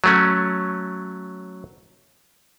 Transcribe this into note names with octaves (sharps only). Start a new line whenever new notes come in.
F#3 A3 C#4